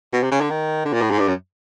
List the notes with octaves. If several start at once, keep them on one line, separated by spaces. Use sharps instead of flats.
B2
C3
C#3
D3
D#3
D3
A#2
A2
G#2
G2
F#2